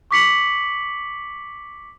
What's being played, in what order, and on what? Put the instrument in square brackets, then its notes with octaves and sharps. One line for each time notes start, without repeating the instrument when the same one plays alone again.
[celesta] C#6 D6 B6 C#7 F#7